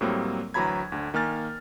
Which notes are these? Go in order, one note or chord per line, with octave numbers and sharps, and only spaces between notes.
A2 F#3 G3 A#3 C4
D2 E3 F#3 A#5 B5 G#6
D2 D3
D#3 A#3 G#5 F6 A6